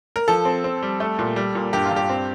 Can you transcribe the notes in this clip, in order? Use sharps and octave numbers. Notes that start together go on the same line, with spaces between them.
A#4
F3 A4
C4
C4
G3
A3
A#2
G3
A#2
G2 G4
F4
G2 G4
C4